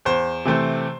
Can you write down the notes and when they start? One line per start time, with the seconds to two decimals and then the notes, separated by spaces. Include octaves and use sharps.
0.05 E2 C5
0.45 C3 E3 A3 C4